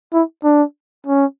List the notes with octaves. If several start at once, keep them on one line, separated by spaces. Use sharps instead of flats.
E4
D4
C#4